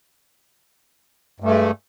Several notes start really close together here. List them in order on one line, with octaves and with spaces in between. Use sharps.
G2 A3 G#3